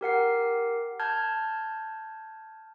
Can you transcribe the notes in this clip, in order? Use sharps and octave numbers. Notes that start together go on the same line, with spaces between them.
G4 A#4 F#5 C7
A5 F6 G6 G#6